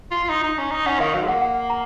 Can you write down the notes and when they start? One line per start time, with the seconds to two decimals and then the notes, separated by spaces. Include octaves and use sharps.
0.11 F4
0.24 F4
0.29 D#4
0.43 D#4
0.58 C#4
0.71 D#4
0.86 C#4 F#5
1.00 D#3 F5
1.14 F#3 F5
1.23 G#3
1.28 A#3 F#5
1.42 F#5
1.70 A#5